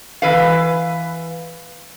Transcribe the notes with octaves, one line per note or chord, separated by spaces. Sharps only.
E3 B4 F5